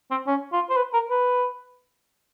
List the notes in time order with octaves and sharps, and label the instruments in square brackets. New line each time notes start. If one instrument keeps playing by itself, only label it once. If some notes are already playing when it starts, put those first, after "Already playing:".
[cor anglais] C4
C#4
F4
C5
B4
A#4
B4